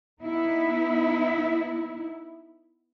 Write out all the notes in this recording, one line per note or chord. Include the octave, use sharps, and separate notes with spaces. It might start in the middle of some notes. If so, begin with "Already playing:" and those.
B3 D#4 E4